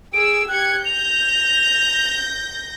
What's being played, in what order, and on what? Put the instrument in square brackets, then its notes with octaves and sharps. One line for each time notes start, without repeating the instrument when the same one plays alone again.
[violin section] G#4 E6 [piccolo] D7
[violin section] G4 G#6 C#7 [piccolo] F#6
[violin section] G6 A#6 [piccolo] F7